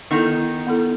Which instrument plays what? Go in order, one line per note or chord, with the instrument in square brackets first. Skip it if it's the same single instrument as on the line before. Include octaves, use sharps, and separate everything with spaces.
[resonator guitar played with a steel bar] D#3 D#4 [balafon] B3 E4 A4
[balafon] B3 E4 A4